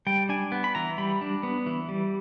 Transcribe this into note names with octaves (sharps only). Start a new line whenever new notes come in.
G3 G5
D4 G#5
B3
B5
E3 A#5
G3 B5
D4
B3
E3
G3